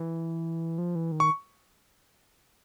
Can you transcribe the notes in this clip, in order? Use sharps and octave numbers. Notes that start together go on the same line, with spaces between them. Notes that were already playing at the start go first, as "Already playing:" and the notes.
Already playing: E3
F3
E3
D#3
C#6